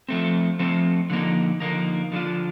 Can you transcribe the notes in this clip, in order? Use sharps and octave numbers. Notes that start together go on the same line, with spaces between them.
F3 A3 C4
F3 A3 C4
D3 F3 A#3 D#4
D3 F3 A#3 D#4
D3 F3 A3 D4 F4